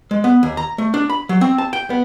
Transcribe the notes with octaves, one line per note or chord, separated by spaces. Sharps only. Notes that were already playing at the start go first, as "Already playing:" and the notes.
G#3
B3
D#2
A#5
A3
D4
B5
F#3
C4
A5
G5
B3